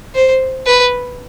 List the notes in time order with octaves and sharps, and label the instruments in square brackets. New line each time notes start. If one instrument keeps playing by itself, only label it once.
[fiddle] C5
B4